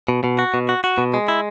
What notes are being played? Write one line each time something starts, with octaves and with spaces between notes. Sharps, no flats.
B2
B2
F#4
B2
F#4
F#4
B2
G#3
E4